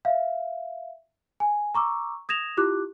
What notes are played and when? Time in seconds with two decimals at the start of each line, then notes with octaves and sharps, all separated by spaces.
0.05 E5 F5
1.40 G#5
1.75 A#5 C#6 D6 E6
2.29 D#6 G#6 A#6 E7 F7
2.57 E4 F4 G4 D6 F#6